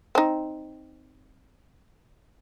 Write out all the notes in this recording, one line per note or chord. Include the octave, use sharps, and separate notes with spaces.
C4 D#4